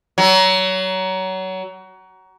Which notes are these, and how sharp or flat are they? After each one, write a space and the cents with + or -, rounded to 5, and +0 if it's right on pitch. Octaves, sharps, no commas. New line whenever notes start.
F#3 +25